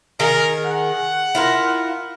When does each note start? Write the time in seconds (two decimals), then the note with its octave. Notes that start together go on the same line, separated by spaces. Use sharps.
0.20 D#3 G#4 A#4
0.66 F#5
1.35 E4 F4 A#4